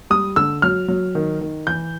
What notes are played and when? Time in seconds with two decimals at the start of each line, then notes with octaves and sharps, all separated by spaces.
0.10 G3 D#6
0.36 D3 E6
0.62 F#3 F6
0.88 F#3
1.15 D#3
1.41 D#3
1.67 E3 G6